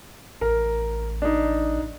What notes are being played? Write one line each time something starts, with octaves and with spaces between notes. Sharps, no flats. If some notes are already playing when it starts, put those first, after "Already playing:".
A1 A#4
D4 D#4